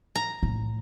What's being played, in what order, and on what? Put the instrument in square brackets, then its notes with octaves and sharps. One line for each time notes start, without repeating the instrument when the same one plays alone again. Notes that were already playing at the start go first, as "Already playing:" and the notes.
[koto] A#5
[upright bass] A2